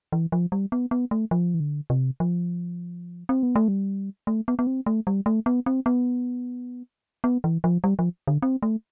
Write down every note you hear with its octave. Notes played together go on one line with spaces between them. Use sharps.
E3
F3
G3
B3
B3
A3
F3
E3
D3
C3
F3
C4
B3
A3
G3
A3
B3
B3
C4
A3
G3
A3
B3
C4
B3
B3
E3
F3
G3
F3
D3
C4
A3